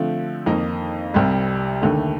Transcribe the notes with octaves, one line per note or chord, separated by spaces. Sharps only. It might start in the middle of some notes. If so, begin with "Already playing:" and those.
Already playing: D3 F3 A3 C4
F2 D#3 A#3 D#4
C2 C3 G3
D#2 D3 A3